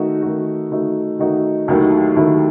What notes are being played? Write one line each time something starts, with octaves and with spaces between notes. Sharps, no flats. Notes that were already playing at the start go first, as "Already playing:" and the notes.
Already playing: D#3 A3 D#4 F#4
D#3 A3 D#4 F#4
D#3 A3 D#4 F#4
D#3 A3 D#4 F#4
D#2 D#3 F#3 A3 E4
D#2 D#3 F#3 A3 E4